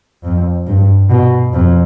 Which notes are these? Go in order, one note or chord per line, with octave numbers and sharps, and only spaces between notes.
F2
G2
B2
F2